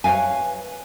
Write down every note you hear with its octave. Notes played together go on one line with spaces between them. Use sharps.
B4 C#5 D#5 F5 G#5